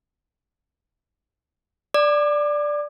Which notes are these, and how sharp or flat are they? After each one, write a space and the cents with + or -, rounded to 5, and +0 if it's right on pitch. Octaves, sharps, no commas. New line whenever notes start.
D5 +0 D6 +30